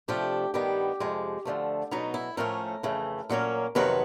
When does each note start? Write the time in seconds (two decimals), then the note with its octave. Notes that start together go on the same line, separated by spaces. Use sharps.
0.08 C3 F3 A3 D4 G4
0.54 G2 D#3 G3 B3 G4
1.00 F2 C3 F3 G#3
1.45 D2 D3 F3 A3
1.91 B2 F#3 B3 D#4
2.14 E4
2.37 A2 F3 A3 C#4 A#4
2.83 F2 C#3 E3 A3
3.29 A#2 F#3 A#3 C#4
3.75 F2 C3 D#3 F#3 B3 B4